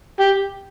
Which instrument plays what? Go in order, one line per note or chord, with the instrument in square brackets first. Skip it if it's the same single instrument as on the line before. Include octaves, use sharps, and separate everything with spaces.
[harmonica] G4